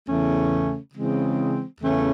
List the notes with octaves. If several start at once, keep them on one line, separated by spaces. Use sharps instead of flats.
E2 C#3 E3 A3 C#4
C#3 E3 G#3 C4
E2 C#3 E3 A3 C#4